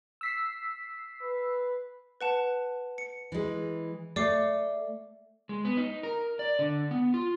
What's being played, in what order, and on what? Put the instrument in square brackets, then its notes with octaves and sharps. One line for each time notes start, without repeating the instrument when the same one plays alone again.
[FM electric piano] E6 B6 C7
[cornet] B4
[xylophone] B4 F#5 A5
C#7
[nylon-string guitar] E3 G#3
[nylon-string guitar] A3 [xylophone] D5 D6 C7
[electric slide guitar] G#3
B3
D#4
A#4
D5
D3
B3
F4